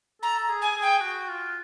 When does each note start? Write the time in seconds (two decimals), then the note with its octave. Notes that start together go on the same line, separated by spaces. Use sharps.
0.22 A4 A#5
0.49 G#4
0.62 G#5
0.75 G#4
0.82 G5
1.01 F#4
1.28 F4